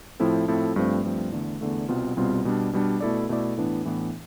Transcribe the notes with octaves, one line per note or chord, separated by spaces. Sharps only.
A2 F3 C4 E4 A4
A2 F3 C4 E4 A4
G2 F3 A3 C4
G2 F3 A3 C4
E2 D3 A3
E2 D3 A3
C2 B2 G3 C4 F4
C2 B2 G3 C4 F4
B2 G3 D4
B2 G3 D4
B2 A3 E4 A4 D5
B2 A3 E4 A4 D5
A2 E3 B3 D4
A2 E3 B3 D4